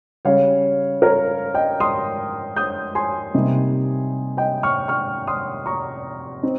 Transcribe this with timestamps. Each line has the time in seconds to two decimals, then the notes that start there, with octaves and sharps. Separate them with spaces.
0.25 C#3 G3 C#4 C#5 F5
1.02 A#4 C#5
1.54 D#5 G5
1.80 C6 D#6
2.56 D#6 G6
2.95 G#5 C6
3.34 C3 G3 A#3 D#4
4.37 D#5 G5
4.63 C#6 F6
4.88 C#6 F6
5.27 C6 D#6
5.66 A#5 C#6
6.43 C4 D#4